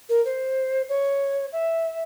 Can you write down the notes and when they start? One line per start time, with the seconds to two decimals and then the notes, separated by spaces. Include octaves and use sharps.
0.09 A#4
0.25 C5
0.89 C#5
1.52 E5